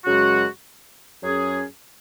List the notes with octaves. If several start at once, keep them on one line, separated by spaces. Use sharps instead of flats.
F#2 C#3 G#3 F#4
F#2 F#3 C#4 G#4